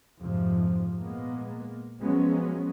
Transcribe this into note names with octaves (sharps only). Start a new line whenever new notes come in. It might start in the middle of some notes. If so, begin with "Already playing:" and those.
F2 G#2 C3 F3
A#2 G#3 A#3 B3
F3 F#3 G#3 B3 C#4